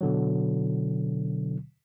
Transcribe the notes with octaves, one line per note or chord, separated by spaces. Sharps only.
B2 D3 F#3